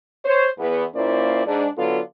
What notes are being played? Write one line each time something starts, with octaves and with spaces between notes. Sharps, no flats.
C5 C#5
E2 B3
A#2 A#3 C#4 E4 C5 D5
G#2 D4
D3 F#3 B3 F4 A4 D5